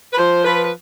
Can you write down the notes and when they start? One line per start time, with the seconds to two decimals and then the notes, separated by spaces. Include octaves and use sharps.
0.13 B4
0.18 F3 C5
0.45 F3 B4
0.65 B4